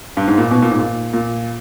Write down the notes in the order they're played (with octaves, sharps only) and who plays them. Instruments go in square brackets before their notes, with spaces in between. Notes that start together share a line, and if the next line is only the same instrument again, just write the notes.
[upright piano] G2
G#2
A#2
B2
A#2
G#2
A#2
A#2